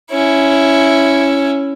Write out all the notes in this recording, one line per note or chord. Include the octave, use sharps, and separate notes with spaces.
C#4 E4